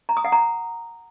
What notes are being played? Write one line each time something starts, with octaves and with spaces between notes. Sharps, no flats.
A#5
D#6
F#5
A#5